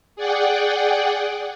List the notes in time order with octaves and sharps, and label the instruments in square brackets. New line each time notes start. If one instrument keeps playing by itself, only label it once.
[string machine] G#4 D5 F#5 G5